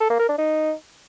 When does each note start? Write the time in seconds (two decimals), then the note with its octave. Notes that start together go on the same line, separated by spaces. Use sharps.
0.01 A4
0.10 A#3
0.19 A#4
0.29 D4
0.38 D#4